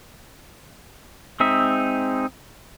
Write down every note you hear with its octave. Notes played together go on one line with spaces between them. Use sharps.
G#3 C4 D#4 E5